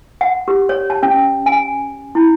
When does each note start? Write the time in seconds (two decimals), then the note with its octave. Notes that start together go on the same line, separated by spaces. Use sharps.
0.21 F#5
0.48 G4
0.69 C#5
0.90 A5
1.03 C#4
1.46 G#5
2.15 E4